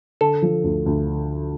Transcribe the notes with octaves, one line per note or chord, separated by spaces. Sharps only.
D3 A4
F3
D2
D2
D3